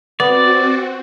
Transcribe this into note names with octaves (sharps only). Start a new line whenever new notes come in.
B3 C4 F#4 D5